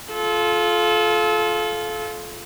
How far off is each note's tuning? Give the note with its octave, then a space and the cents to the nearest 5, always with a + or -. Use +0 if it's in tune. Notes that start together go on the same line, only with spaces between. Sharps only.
F4 +0 A4 -30